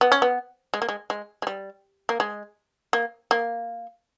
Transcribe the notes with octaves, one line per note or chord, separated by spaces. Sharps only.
B3
C#4
B3
G#3
A#3
G#3
G#3
G#3
G3
A#3
G#3
A#3
A#3